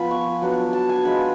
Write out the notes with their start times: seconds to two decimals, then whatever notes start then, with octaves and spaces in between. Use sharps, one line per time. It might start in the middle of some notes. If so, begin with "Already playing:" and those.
Already playing: F3 B3 F4 G#5 B5
0.11 C#6
0.42 F#3 B3 D4
0.73 A5
0.89 G#5
1.05 G#3 D4 F4 B5